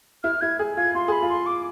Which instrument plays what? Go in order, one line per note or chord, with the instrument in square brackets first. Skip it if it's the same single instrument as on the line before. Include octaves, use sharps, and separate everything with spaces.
[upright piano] E4 [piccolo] F6
[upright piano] E4 [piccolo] G#6
[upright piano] G#4
[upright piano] F4 [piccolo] G#6
[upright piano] F4 [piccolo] C6
[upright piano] G#4 [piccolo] B5
[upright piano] F4
[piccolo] C6
D6